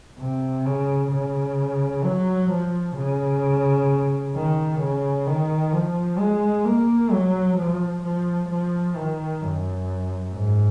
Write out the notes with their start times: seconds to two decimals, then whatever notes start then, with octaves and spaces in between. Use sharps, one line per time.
0.19 C3
0.66 C#3
1.12 C#3
2.04 F#3
2.51 F3
2.97 C#3
4.35 D#3
4.81 C#3
5.27 D#3
5.73 F3
6.19 G#3
6.65 A#3
7.11 F#3
7.57 F3
8.03 F3
8.50 F3
8.96 D#3
9.42 F#2
10.34 G#2